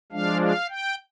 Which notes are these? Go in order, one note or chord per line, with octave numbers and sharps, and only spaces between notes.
F3 G#3 D4 F5
F5
G5